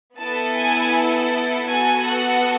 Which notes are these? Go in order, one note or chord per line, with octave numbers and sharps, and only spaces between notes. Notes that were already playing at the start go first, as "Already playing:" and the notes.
B3 E4 A4 A5
G#5
B3 F#4 A4 G#5
F#5